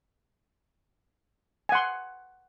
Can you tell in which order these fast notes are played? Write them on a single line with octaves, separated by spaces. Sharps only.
G#5 F#5 C6